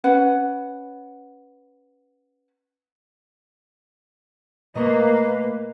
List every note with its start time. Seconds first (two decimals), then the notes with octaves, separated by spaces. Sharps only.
0.04 C#4 B4 F#5
4.75 A#2 A3 A#3 B4 D#5 A#5 C#6